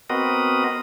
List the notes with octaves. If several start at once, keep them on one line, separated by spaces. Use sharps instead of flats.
B3 C4 F#4 A#4 D#5